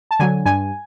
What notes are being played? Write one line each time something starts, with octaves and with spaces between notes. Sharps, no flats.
A5
D3 F#3 G#5
G2 G#5